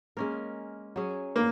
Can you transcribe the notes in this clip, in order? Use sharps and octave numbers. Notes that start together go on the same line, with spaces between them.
G#3 A#3 C#4 A#4
F#3 C#4 G#4
A#3